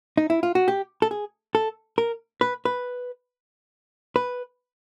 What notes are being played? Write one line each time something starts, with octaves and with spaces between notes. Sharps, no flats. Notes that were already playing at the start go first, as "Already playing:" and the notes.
D#4
E4
F4
F#4
G4
A4
G#4
A4
A#4
B4
B4
B4